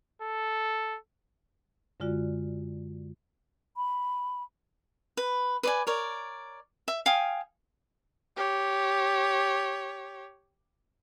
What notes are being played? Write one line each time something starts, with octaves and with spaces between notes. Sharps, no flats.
A4
F#2 D3 G#3 F4 F#4 D5
B5
B4
B4 D5 G#5
A#4 C#5 D5
E5
F5 G5 G#5 D#6
G4 C#5